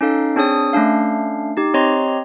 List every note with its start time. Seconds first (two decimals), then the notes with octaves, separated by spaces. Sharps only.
0.01 C#4 D#4 A4 F5
0.36 C4 D4 G#4 C#5 D#6
0.73 A3 C#4 D4 F5
1.57 D#4 G4
1.74 C4 G4 C#5 D#5 A#5 C6